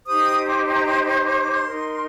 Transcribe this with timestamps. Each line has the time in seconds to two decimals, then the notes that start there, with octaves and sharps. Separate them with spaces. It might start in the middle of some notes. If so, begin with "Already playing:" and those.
0.06 D#4 G4 C5 D#6
0.47 D6
0.73 A#5
0.86 C6
1.26 D6
1.39 D6
1.52 C6
1.66 D#4 A#4